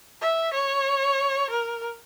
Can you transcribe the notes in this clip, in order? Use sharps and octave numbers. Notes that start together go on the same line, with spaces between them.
E5
C#5
A#4